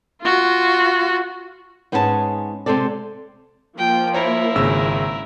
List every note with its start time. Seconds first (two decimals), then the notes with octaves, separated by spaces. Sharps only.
0.22 F4 F#4
1.92 G#2 B3 C#4 G#4 A4 A5
2.66 C3 G#3 C4 A4 D5
3.78 F3 A#3 G5
4.14 E4 A#4 C5 C#5
4.55 G#1 C#3 E6